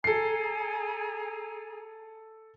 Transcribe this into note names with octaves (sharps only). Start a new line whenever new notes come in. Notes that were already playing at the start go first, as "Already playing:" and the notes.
G#4 A4 G#5 A#5 C7